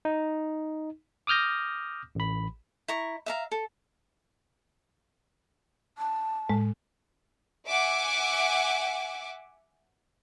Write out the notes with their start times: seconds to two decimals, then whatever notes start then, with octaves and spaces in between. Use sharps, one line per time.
0.05 D#4
1.27 D6 D#6 F6 G6 A#6
2.15 A1 B5
2.88 E4 A#5 C#6
3.26 E5 F5 A#5
3.52 A4
5.98 A5
6.49 A2 G#3
7.69 E5 F#5 G#5 D6